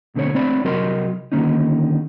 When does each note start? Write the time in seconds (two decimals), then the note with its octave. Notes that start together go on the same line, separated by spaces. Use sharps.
0.15 B2 D3 A3 C4 C#5
0.34 A3 C4 C#5 D5 B5
0.64 C2 F#3 F#4 A#4 D#5 C6
1.32 D3 D#3 F#3 A#3 C#4 D#4